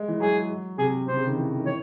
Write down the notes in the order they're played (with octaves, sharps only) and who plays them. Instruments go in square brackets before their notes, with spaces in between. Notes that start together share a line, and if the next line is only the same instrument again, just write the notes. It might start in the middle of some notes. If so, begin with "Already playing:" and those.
Already playing: [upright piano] G#3
E3
[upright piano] F#3 [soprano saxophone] G#4
[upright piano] C3 [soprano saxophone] G#4
[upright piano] C3 [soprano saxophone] C5
[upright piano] C#3
D#3
E3
D#3
[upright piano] E3 [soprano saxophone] C#5